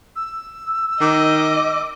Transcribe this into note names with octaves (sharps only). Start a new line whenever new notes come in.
E6
D#3 D#5 D6